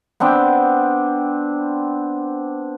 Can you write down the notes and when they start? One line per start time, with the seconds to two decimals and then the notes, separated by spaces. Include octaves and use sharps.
0.20 B3 C4 D4 G5